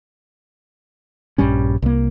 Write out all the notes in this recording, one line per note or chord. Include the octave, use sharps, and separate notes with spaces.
A#1 G2 G3 C#4
C2 A#3